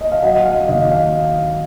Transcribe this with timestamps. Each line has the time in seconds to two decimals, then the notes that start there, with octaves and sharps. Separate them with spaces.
0.01 D#5
0.12 F5
0.22 F#3 D#5 F#5
0.45 F5
0.68 D#2 D#5
0.91 F5